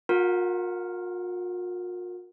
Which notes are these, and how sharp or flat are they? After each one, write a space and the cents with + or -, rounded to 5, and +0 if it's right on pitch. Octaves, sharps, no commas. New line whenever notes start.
F4 +45 A#4 +0 F#5 +0